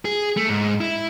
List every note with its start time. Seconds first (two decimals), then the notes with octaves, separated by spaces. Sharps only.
0.05 G#4
0.37 A3
0.49 G#2
0.81 E4